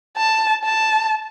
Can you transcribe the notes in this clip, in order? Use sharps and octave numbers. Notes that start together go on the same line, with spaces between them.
A5
A5